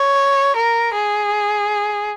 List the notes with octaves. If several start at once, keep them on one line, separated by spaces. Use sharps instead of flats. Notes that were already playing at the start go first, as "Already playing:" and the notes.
Already playing: C#5
A#4
G#4